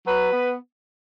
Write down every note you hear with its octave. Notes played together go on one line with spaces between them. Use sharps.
F#3 B4
B3